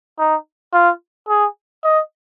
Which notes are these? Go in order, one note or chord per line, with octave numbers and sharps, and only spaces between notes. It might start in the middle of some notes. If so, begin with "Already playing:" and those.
D#4
F4
G#4
D#5